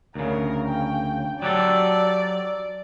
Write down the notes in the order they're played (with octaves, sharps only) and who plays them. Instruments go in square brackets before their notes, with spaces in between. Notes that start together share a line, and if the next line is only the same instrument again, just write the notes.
[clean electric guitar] D2 C#3 [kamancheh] A#4
[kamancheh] G5
[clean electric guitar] F#3 G4 A4 [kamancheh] D5